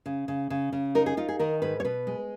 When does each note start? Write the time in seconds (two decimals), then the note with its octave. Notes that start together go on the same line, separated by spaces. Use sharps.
0.06 C#3
0.28 C#3
0.50 C#3
0.72 C#3
0.95 D#4 A#4
1.06 G#4
1.17 D#4 F4
1.28 G#4
1.39 D#3 A#4
1.62 G#2 B4
1.80 C#5
1.85 B2 B4
2.07 G#3